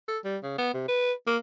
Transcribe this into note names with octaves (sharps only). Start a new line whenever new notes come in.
A4
G3
C#3
B3
C3
B4
A#3